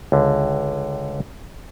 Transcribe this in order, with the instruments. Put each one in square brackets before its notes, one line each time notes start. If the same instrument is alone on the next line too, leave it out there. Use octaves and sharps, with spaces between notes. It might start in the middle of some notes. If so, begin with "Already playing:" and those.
[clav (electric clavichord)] C#2 D3